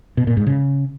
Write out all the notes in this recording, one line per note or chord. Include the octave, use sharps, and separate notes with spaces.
B2
A#2
G#2
C#3